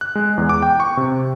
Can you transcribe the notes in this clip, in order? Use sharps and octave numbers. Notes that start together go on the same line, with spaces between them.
F#6
G#3
E2
D6
G5
C#6
C3